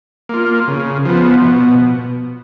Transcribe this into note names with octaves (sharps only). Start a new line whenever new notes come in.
A#3 F4
C#3
F3 B3
B2